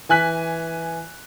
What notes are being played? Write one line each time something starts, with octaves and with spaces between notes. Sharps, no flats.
E3 G#5 F#6 B6